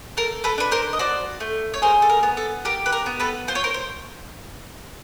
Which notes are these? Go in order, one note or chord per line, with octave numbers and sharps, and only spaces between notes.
A4 A#4
A4 B4
D4 B4
A#4 C5
D#5
F#4 C5 D5
A3
C#5
G#4 A#4 C5
A4
A#4
B3
A4
G4 A#4
B4
A#4
B3
A4 B4
F4 C5
C#5
A#4 C5
C5